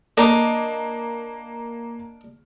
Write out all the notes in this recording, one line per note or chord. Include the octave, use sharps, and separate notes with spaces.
A#3 D4 D#5 A#5 D6